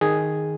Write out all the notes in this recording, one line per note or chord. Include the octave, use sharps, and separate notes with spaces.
D#3 G#4